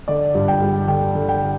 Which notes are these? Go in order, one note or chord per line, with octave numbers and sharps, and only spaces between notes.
D3 D5
G2
G5
G3
D3 G5
D3
G5